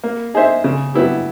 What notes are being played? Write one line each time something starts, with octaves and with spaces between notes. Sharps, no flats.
A#3
D#4 G#4 C5 E5
C#3
F#3 B3 E4 G4